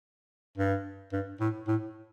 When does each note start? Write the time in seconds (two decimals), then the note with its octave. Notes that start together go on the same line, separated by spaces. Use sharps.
0.58 G2
1.13 G2
1.40 A2
1.68 A2